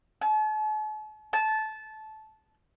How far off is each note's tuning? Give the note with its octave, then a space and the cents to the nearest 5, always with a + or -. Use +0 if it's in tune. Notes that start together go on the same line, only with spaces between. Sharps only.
A5 -45
A5 -15